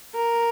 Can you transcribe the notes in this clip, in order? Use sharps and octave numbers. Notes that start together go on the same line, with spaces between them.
A#4